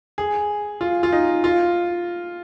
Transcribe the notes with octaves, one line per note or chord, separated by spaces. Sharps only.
G#4
F4
F4
D#4
F4